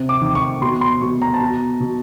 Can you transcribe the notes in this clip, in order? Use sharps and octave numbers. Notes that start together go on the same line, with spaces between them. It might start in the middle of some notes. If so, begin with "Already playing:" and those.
Already playing: C3
D6
D#3 D6
C#6
B2 C6
C6
B2 C#6
A#5
A5
B2
A#5
B2